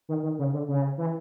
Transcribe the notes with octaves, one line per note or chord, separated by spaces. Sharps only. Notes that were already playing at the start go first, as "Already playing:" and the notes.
D#3
D#3
C#3
D3
C#3
E3